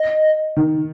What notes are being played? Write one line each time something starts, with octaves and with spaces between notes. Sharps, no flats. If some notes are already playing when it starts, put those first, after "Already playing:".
Already playing: D#5
D#3